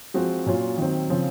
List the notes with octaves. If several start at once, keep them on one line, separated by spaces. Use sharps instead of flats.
F3 G#3 C4 F#4
A#2 F#3 C#4 F4
D#3 F#3 C4
C#3 F3 C4